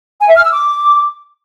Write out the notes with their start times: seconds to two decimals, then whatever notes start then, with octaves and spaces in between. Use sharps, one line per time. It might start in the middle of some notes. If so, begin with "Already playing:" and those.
0.21 G#5
0.28 E5
0.36 F6
0.44 E6
0.52 D6